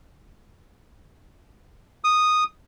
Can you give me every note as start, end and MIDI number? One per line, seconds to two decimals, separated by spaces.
2.04 2.44 87